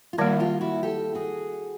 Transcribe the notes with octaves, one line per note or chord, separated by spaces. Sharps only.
F4
D#3 G3 A#3 E4 F#4
F4 G4
E4 F#4
G4 A4
F#4 G#4